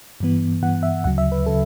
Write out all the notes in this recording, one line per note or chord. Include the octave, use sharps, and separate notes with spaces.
G2 E3 B3
G2 E3 B3 F#5
E5
D2 C#3 F#3 F#5
E5
B4
C#3 F#3 A4